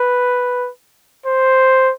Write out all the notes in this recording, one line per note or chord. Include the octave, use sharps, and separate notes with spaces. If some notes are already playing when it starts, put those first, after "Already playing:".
Already playing: B4
C5